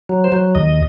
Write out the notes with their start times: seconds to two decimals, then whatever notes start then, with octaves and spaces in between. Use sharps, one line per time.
0.09 F#3
0.24 C5
0.32 F#3
0.55 D#2 D#5